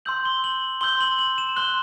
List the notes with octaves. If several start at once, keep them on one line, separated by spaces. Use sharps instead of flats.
C6 E6 G6 F#7
G7
F#7
C6 E6 G6 G7
F#7
F#7
E7
C6 F#6 G7